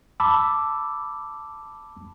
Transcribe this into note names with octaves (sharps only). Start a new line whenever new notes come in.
A5 B5 D6 E6